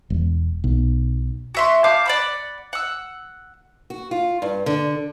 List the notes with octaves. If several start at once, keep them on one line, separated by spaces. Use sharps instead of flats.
E1
B1
F#4 E5 C6
F5 A5 D6 G6
D5 F#5 B5
F#5 E6
F#4
F4
G2
D3